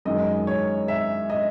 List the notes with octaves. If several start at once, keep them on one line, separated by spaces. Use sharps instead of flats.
F#2 D#3 G#3 D#5
C#5
E5
D#5